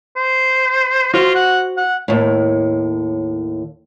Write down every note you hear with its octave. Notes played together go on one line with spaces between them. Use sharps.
C5
F4 F#4 C5
F#5
F#5
D#2 A2